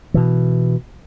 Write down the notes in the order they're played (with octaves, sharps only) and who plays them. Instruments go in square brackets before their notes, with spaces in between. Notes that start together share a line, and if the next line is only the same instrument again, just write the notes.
[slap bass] B2 E3